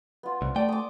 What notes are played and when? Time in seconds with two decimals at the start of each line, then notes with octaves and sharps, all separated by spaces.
0.23 B3 F4
0.42 C2
0.56 A3 D5 G5
0.69 D6 D#6